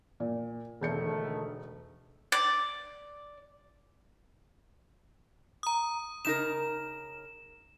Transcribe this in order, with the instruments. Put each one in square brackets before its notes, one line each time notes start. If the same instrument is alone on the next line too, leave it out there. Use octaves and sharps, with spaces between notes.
[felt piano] A#2
[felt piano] E1 G6 C#7 [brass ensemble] D3 D#3 A3
[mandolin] D5
[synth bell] A#5 D#6
[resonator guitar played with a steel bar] C#3 D#4 A#4 [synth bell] E7